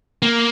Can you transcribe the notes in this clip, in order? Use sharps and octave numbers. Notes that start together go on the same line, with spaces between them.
A#3